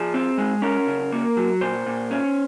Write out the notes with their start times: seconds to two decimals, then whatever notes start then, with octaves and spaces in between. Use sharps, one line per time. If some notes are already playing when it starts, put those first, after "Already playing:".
Already playing: F3 G#4
0.14 C4
0.38 G#3
0.62 C#4 A#4
0.87 C#3
1.12 A#3
1.37 F#3
1.61 A#2 C5
1.86 A#2
2.11 C#4